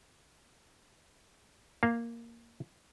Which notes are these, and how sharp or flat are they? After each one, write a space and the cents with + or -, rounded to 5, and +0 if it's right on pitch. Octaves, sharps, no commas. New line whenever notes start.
A#3 +0 F5 -5